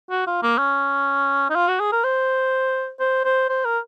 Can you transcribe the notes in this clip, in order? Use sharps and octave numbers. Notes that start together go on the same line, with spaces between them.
F#4
F4
A#3
C#4
D#4
F4
F#4
G#4
A#4
C5
C5
C5
C5
A#4